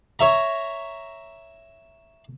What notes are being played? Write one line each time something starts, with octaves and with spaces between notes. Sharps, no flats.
C#5 E5 A#5